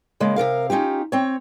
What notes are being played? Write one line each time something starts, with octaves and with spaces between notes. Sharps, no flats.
C#3 G#3 A#3
C3 E3 A#4 F5
C#4 D#4 F4 G4
C4 C#5